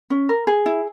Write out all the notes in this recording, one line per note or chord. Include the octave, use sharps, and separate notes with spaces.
C#4
A#4
G#4
E4